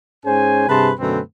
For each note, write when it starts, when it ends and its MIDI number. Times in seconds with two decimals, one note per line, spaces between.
0.25 0.66 44
0.25 0.66 61
0.25 0.66 68
0.25 0.66 72
0.25 0.66 80
0.68 0.91 43
0.68 0.91 48
0.68 0.91 68
0.68 0.91 71
0.68 0.91 81
0.68 0.91 84
0.99 1.20 42
0.99 1.20 47
0.99 1.20 50
0.99 1.20 57
0.99 1.20 60
0.99 1.20 71